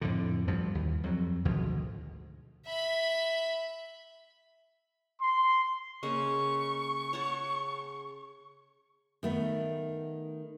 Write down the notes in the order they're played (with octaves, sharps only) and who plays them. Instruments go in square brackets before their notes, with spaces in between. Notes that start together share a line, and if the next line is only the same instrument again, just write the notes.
[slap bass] F2 A2 D3
D2 G2 F3
D#2 E3
F2 F#3
G#1 D2 B2 F3
[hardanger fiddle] E5 B5
[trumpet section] C6
[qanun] C#3 A#3 D#5 [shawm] C#6
[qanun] C#5 F#5 A5
[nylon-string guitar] D#3 A3 B3